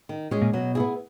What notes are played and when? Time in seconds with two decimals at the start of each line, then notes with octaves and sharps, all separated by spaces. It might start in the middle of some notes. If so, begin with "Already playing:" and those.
0.09 D#3
0.31 G#3 C#4 G#4
0.42 A#2
0.53 B2 F#3
0.75 B3 E4 G#4